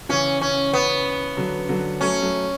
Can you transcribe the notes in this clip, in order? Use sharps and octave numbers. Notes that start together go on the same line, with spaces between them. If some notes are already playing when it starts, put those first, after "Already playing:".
C#3 E3 C#4
C#4
B3
D3 F#3
D3 F#3
F#3 A3 C#4
F#3 A3